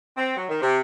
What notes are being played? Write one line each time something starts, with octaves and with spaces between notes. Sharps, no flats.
C4
F#3
D#3
C3